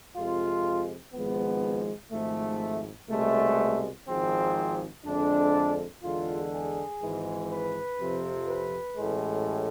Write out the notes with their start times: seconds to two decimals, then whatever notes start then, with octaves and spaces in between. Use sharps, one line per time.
0.15 F2 C3 G#3 F4
1.13 G#1 G#2 F3 G#3 B3
2.11 G#1 G#2 F3 A3
3.09 C2 B2 G#3 A3
4.07 G#1 G#2 F3 G#3 C4
5.04 F2 D3 G#3 D4
6.03 E2 D3 G#3 F4
6.51 G#4
7.00 G#1 G#2 E3 G#3
7.49 B4
7.98 F2 C3 F3
8.47 B4
8.96 A1 A2 G#3